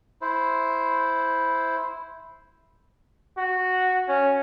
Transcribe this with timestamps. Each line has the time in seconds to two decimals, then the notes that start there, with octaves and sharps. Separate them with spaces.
0.22 E4 C5
3.38 F#4
4.08 C#4